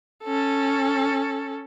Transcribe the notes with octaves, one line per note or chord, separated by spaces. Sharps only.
C#4 A4